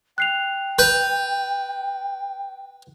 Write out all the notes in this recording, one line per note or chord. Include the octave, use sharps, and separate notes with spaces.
G5 F#6 C7 F7
B4 G6 F7